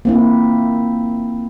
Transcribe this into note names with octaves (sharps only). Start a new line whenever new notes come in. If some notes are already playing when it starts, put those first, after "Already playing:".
A#3 C4 E4